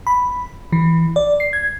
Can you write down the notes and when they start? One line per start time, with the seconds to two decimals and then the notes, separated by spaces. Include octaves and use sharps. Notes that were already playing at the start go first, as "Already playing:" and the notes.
0.07 B5
0.72 E3
1.16 D5
1.40 C7
1.53 G#6